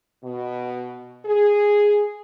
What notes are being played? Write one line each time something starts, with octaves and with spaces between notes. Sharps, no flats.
B2
G#4